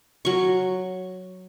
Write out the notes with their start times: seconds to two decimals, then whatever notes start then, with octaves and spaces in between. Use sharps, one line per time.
0.25 F#3 C#6